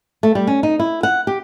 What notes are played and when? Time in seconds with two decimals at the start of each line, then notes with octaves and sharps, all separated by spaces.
0.23 A3
0.35 G3
0.47 C#4
0.63 D#4
0.79 E4
1.03 F#5
1.27 G4